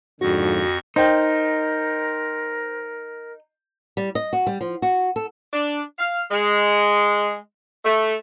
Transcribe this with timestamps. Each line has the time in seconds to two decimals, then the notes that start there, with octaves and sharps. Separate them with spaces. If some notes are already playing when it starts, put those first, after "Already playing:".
0.21 F2 G#2 D3 F3 F#4 C#6 A#6
0.96 D#4 A#4 C5 G5
3.97 G3
4.15 D#5
4.33 F#4
4.47 G3
4.61 F3
4.82 F#4
5.16 A4
5.53 D4
5.99 F5
6.30 G#3
7.85 A3